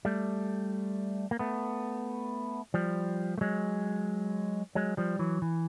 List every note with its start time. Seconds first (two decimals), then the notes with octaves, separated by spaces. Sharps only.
0.05 G3 A3
1.31 A#3
1.39 A3 B3
2.74 F3 G3
3.38 A3
3.41 F#3 G#3
4.75 F#3 G#3
4.97 F3 G3
5.19 E3 F#3
5.42 E3